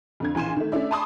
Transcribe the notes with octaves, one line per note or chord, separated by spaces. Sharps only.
F2 D3 G#6
A#1 E3 G#5 C6 E7
D#3 A3
A3 C#4 D4 E4 D5 E5
G#5 A5 B5 C6 D6 D#6